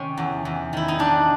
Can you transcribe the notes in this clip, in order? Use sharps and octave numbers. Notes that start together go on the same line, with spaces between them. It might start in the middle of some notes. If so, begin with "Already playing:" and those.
Already playing: C3 D#3 C#4
E2
E2
D#3 E4
D#4
C3 D4